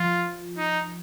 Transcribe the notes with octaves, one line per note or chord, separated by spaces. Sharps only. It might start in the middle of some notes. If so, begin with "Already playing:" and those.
Already playing: F3 F4
D#4